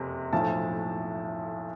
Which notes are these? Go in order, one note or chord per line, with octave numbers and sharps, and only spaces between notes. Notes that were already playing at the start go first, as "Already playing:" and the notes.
Already playing: F#1 F2 C3
B1 A2 F3 A5